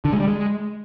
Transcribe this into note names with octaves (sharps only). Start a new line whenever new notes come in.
D3
G#3
G3
G#3